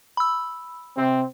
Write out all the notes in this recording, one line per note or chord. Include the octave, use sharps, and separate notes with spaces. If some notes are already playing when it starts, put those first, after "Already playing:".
B5 E6
C3 C4